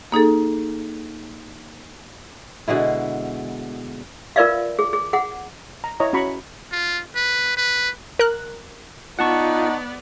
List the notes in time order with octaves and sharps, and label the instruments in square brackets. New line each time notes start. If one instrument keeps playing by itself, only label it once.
[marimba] A#3 D#4 G#4 A4
[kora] B2 D3 G#3 E4
[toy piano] F4 A#4 B4 D5 E5 F5
G#4
G#4
G#4 F#5
[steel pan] A#5
E4 C#5 D#5 A#5
C#4 F#4 A#5 B5 C#6
[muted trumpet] F4
B4
B4
[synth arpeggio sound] A#4 F#6
[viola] B3 D5 [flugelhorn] D#4 [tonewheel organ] F4 [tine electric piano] F#5 A5 C#6